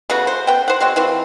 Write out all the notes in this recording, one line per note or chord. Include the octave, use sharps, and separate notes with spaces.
C#3 A3 B3 F#4
C5
B3 G5
C5 F#5
G#3 C4 F#4
E3 F3 C4